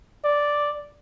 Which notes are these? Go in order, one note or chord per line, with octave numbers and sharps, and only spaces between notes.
D5